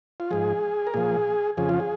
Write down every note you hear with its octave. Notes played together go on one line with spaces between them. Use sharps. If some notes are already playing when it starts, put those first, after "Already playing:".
F4
G#2 F3 G#4
A#4
A#2 F3 G#4
F2 C#3 F3 G#4
F4
G#4